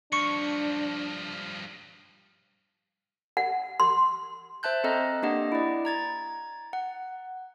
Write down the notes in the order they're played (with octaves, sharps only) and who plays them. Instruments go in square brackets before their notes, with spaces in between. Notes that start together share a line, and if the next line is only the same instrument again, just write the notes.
[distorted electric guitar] G2 F3 [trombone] D4 [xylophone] C#6 C#7
[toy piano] F#5
C6
[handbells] C5 E5 A5 F#6 G6
C4 A4 D#5 A#5
A#3 D4 G4 D#5 F#5
E4 D5
A#5 G#6 A6
F#5